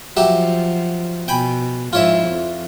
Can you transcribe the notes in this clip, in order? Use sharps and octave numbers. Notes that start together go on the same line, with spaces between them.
F3 F#3 G4 E5
B2 G5 G#5 B5
G#2 F3 E4 F4 C#5 E5
F2